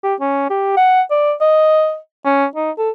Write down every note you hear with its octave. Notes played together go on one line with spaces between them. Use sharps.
G4
C#4
G4
F#5
D5
D#5
C#4
D#4
A4